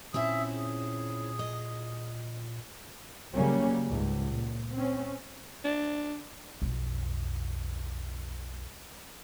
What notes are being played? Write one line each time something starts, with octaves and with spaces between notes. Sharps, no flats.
A#2 C4 C#4 E4 E5 D#6 E6
G#4
D#5
C#3 F#3 G3 A#3 C#4
C#2 G#2
A#2
C4 C#4
D4
B1 F2